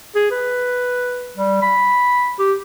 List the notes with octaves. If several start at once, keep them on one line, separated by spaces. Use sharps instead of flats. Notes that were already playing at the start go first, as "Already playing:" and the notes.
G#4
B4
G3
B5
G4